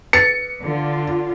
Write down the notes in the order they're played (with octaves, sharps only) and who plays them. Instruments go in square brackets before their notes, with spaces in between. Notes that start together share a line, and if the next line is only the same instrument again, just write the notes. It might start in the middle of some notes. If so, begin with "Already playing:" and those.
[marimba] B4 A6 [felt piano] C#7
[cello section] D3 F4